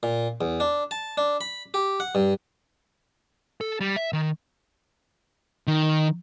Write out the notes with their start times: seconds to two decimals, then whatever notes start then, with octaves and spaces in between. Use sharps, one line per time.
0.03 A#2
0.41 E2
0.60 D4
0.91 A5
1.18 D4
1.41 B5
1.74 G4
2.00 F#5
2.15 G2
3.61 A4
3.81 G3
3.96 E5
4.13 D#3
5.67 D#3